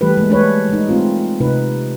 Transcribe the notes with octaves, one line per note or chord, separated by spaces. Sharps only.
E3 G3 A3 G4 A4 B4
G#3 A#3
A3 D4 B4 C#5
G#3 D#4
A3 C4 F4
C3 D#4 B4